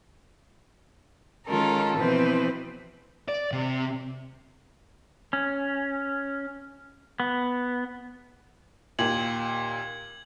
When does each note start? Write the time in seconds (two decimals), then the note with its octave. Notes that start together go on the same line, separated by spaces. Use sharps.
1.47 D#3 G#3 C#4 F4 A4 A#4
1.96 B2 E3 F3 C4 B4
3.29 D5
3.52 C3
5.33 C#4
7.20 B3
8.99 D#2 A#2 G#6 F#7